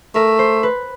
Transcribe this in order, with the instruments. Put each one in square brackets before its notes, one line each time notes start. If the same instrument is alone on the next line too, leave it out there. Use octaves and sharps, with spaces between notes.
[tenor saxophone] A3 [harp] A#4
[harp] C5
B4